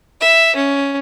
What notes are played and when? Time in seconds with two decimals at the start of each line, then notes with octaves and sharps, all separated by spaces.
0.21 E5
0.55 C#4